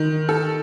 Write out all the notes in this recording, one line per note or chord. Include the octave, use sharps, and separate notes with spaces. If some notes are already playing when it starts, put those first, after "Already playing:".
Already playing: D#3
A4